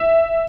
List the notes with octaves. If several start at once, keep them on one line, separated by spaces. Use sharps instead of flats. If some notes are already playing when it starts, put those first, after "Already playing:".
Already playing: E5